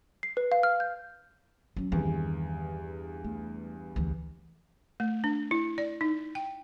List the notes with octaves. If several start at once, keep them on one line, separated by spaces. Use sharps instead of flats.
C7
B4
F5
F6
G6
F#3 C#4
E2 G2 D#3 C4
A3
D2 E3
A3
D4
E4
D5
D#4
G5